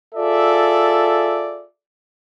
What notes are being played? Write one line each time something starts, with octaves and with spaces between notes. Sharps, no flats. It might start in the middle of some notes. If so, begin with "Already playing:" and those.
F4 G#4 A4 D5 E5